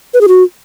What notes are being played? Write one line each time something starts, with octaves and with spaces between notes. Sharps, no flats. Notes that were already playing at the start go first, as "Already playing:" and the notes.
B4
G#4
F#4